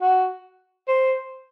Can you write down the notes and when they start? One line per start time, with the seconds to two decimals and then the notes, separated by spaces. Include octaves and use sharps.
0.02 F#4
0.88 C5